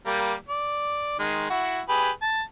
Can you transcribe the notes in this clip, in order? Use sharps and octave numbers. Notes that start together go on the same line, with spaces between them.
G3 A#3
D5
D#3 G#3
E4 F#4
G4 G#4 B4
A5